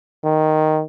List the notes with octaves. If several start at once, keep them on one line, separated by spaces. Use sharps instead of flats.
D#3